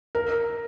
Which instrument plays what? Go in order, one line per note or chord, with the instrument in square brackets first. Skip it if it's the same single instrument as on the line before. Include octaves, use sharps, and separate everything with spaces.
[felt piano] A#4